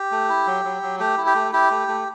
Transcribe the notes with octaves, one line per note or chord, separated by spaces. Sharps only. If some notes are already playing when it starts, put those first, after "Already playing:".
Already playing: G4
A3
E4
F#3
F#3
F#3
A3 G4
E4
G4
A3
E4 G4
A3
A3